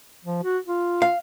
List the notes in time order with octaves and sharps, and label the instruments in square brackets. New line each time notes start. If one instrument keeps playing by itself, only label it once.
[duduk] F3
F#4
F4
[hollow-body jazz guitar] F5